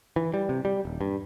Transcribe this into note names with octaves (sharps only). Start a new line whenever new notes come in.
E3
G3
C3
G3
D#1
G2